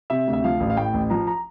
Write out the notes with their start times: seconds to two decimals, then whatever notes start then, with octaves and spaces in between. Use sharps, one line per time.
0.10 C3 E5
0.27 D2
0.33 E5
0.44 F3 F5
0.60 A1
0.70 F5
0.77 A2 G5
0.93 A1
1.10 F3 A#5
1.27 A#5